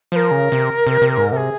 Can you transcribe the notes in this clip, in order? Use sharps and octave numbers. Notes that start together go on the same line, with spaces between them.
F3 A#4 C5
C#3
C3
C3
C3
G#2
C3 G#4 A#4